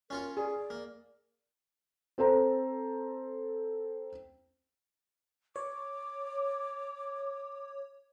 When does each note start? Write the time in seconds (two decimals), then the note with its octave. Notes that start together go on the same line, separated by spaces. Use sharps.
0.10 C#4 F4 A#4 C#5
0.37 G#4 D5
0.70 A#3
2.18 C4 A4 C5 A#5
5.56 C#5 D6